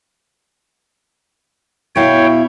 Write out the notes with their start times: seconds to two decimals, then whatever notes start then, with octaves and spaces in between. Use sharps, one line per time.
1.96 B2 E4 C#5 F5 G5